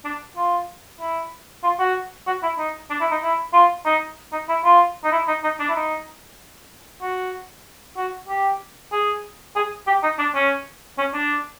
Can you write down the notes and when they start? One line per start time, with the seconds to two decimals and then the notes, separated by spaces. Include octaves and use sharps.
0.04 D4
0.37 F4
1.00 E4
1.63 F4
1.79 F#4
2.27 F#4
2.43 E4
2.58 D#4
2.90 D4
3.00 E4
3.11 D#4
3.22 E4
3.54 F4
3.85 D#4
4.32 D#4
4.49 E4
4.64 F4
5.04 D#4
5.12 E4
5.28 D#4
5.44 D#4
5.60 D4
5.68 E4
5.76 D#4
7.02 F#4
7.97 F#4
8.29 G4
8.92 G#4
9.56 G#4
9.87 G4
10.03 D#4
10.19 D4
10.35 C#4
10.98 C#4
11.14 D4